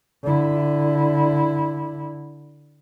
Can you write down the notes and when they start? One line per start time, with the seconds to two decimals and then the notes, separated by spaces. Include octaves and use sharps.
0.23 D3 E4